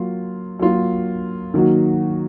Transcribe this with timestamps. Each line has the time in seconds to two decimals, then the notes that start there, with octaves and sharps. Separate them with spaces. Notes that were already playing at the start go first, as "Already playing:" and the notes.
Already playing: F#3 A#3 F4
0.59 F#3 A#3 F4
1.54 D#3 F#3 A#3 D#4 F#4